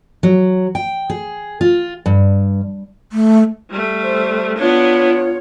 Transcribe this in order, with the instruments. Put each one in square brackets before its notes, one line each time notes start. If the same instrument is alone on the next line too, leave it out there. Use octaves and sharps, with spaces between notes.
[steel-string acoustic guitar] F#3
G5
G#4
F4
G2
[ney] A3
[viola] G3 A3
[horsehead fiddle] C5
[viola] B3 D4 [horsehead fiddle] F4 C#5